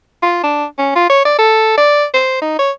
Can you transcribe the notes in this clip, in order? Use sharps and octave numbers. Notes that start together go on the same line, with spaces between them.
F4
D4
C#4
F4
C#5
D5
A4
D5
C5
D#4
C#5